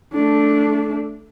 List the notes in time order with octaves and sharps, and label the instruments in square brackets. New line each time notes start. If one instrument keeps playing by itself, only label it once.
[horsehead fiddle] A3 D4